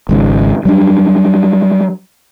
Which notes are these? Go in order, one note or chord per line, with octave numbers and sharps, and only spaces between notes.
G#1 G#2 C#3
F#3 G3 D4